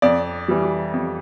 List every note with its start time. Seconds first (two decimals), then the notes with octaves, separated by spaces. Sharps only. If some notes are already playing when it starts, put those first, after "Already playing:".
0.02 F2 D5
0.48 E3 G3
0.94 F2